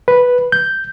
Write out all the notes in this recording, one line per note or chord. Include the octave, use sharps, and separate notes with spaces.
B4
G6